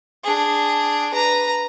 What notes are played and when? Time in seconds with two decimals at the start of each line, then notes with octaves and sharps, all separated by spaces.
0.24 D4 G#4
1.13 B4 A#5